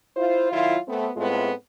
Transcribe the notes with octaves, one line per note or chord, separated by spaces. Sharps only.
E4 F4 C5
D#3 F#3 E4 F4
A3 B3 C4
A2 G#3 A3 B3 C4 F4